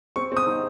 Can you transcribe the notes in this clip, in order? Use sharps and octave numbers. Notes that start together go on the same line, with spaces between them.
C4 C#6
C4 D#6
D#4